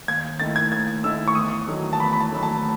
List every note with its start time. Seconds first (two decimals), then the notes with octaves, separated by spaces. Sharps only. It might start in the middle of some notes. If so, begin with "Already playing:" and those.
0.08 D#2 G#6
0.40 D#3 A3 E4 A6
0.56 G#6
0.72 D#2 G#6
1.04 D#3 A3 E4 E6
1.28 C#6
1.35 E2 D#6
1.68 D#3 F#3 A3
1.93 A5
2.00 E2 B5
2.13 B5
2.20 A5
2.32 D#3 F#3 A3
2.43 A5